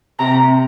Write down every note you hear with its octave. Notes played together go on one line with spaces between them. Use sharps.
C3 A#5